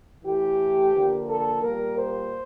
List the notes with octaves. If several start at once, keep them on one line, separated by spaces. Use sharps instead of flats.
A2 E3 A3 G4
D3 F3 A#3
A4
A#2 G3 A#3 A#4
C5